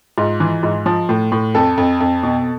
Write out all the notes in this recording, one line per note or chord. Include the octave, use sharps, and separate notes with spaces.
G#2 F4
E3
G#2
F3
A2
A2
F2 A4
F2
F2
B2